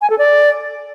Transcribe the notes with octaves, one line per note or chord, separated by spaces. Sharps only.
G#5
A4
D5